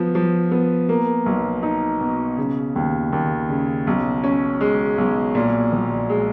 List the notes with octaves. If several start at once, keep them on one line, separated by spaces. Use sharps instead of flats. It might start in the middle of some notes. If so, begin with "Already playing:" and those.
Already playing: F3 B3
F3
B3
A#3
B1
D#4
B2
C#3
D#2
D#2
C#3
B1
C#4
G#3
B1
A#2
A#1
G#3